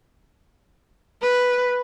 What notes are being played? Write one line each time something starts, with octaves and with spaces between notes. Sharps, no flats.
B4